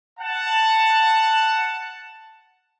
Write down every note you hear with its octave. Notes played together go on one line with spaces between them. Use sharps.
F#5 A5